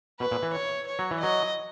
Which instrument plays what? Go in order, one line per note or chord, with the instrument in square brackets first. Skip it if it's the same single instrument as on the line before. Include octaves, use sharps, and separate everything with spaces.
[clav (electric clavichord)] B2 [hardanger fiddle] B4
[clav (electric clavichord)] A#2
E3
[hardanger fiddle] C#5
C#5
[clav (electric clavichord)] F#3
E3
[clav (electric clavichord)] F#3 [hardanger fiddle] D#5